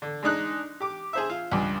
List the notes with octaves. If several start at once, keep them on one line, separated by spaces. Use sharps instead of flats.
D3
G#3 D4 D#4 F#6
G4 D6
G#4 C5 E5
F4
C#2 G2